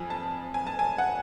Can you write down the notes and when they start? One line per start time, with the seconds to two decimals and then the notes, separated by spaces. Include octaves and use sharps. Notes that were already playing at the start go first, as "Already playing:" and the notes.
Already playing: F2 F3 G#5
0.10 A5
0.54 G#5
0.67 A5
0.79 G#5
0.98 F#5